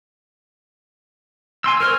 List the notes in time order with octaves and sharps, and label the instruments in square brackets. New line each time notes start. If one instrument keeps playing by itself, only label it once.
[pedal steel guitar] G#5 C6 E6
[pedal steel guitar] A#4 C5 C#5 [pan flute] F6